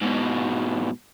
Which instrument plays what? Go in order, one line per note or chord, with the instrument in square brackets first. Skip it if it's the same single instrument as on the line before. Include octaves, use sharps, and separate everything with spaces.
[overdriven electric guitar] G#2 B2